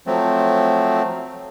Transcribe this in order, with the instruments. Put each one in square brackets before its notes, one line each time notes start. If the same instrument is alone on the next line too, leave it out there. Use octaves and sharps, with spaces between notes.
[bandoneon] F3 F#3 A3 C4